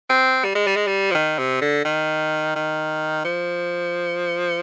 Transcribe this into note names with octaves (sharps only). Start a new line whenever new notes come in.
C4
G3
G#3
G3
G#3
G3
F3
D#3
C3
D3
D#3
D#3
F3